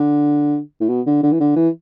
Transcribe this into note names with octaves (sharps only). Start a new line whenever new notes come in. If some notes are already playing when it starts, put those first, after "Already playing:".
Already playing: D3
A2
B2
D3
D3
E3
D3
E3